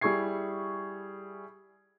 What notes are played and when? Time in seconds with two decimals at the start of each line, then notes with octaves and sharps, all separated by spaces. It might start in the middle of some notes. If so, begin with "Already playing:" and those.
0.01 G3 E4 G#4 C#6 G#6 C7